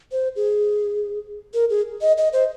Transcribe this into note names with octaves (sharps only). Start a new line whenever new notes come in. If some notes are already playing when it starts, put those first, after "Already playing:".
C5
G#4
A#4
G#4
D#5
D#5
C5